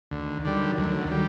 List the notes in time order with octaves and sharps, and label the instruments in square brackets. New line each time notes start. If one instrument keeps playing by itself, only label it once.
[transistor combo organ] D2 [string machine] D#3
[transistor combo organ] D3 G3 [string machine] F#3
[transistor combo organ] D2 [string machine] D3
[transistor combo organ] G3